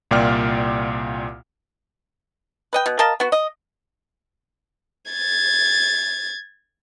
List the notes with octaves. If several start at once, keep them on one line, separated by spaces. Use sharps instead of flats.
C2 A#2 F4 D5 G5 F6
B4 D#5 G5
B2
A#4 D#5 F5 A5
B3 F#4
D#5
G#6 A6